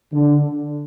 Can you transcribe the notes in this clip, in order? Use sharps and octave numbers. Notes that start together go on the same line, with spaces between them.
D3